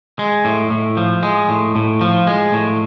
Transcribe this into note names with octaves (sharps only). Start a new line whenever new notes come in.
G#3
A2
A2
F3
G#3
A2
A2
F3
G#3
A2